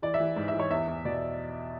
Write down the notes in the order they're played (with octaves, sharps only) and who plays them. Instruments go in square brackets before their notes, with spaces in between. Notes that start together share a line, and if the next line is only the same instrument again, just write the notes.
[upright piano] E3 D5
E5
E3
G#2
E5
E3
C#5
E2 E5
E2
B2 D5